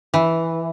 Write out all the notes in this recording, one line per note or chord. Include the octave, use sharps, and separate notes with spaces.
E3